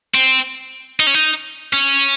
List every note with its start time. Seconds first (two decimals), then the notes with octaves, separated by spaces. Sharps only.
0.14 C4
1.00 D#4
1.07 C#4
1.14 D#4
1.73 C#4